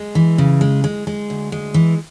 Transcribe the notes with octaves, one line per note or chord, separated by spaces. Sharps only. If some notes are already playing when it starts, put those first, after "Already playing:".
Already playing: G#3
E3
C#3
G#3
G#3
G#3
D2
G#3
E3